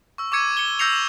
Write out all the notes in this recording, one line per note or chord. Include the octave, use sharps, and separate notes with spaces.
C#6 E6
C#6 D6 E6 G#6 C#7 D#7
C#7 G7
E6 G6 A#6 C7 C#7 F7
E7